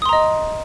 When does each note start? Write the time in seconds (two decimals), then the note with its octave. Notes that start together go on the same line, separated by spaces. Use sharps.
0.02 D#6
0.06 C6
0.09 A#5
0.13 D#5